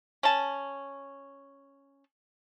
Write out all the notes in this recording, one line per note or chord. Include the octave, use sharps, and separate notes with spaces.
C#4 A5